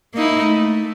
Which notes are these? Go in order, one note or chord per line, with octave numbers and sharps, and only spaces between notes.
A#3 D#4 E4
A3